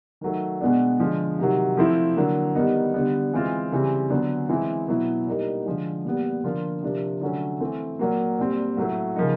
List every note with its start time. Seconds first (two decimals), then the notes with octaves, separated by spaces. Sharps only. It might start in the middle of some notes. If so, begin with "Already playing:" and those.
0.21 D#3 F#3 A3
0.61 B2 G#3 B3 D4
1.00 D3 F3 G#3
1.39 C3 D#3 F#3
1.77 F3 A3 C4 E4
2.16 D3 F#3 A#3
2.55 D#3 G3 B3 D#4
2.94 D3 G3 B3
3.33 E3 G#3 C4 F4
3.72 C#3 E3 G3 C4
4.10 D3 F#3 B3 D4
4.49 E3 G#3 C4 E4
4.88 B2 F#3 B3 E4
5.27 A#2 G3 A#3 D#4
5.66 D3 F3 G#3
6.05 A#2 G3 B3
6.44 D3 F3 A#3 D4 F4
6.82 C3 F3 A#3 D4
7.21 D3 F#3 A3 C#4
7.60 E3 A3 C4
7.99 A#2 F#3 A#3
8.39 A#2 G3 C4
8.77 A2 F#3 A3
9.16 C#3 F3 A#3 D#4